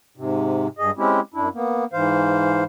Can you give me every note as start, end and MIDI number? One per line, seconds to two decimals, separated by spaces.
0.17 0.67 44
0.17 0.67 48
0.78 0.91 43
0.78 0.91 68
0.78 0.91 75
0.98 1.20 56
0.98 1.20 60
0.98 1.20 61
0.98 1.20 64
0.98 1.20 67
1.34 1.49 42
1.34 1.49 62
1.34 1.49 64
1.54 1.85 58
1.54 1.85 59
1.93 2.64 44
1.93 2.64 52
1.93 2.64 72
1.93 2.64 77